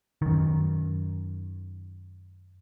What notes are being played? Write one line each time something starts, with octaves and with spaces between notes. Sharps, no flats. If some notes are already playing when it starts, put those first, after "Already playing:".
F#2 D#3